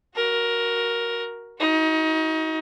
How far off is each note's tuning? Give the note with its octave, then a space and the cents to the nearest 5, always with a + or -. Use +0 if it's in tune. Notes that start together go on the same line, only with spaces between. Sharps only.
F#4 +0 A#4 +10
D#4 +30 F#4 +0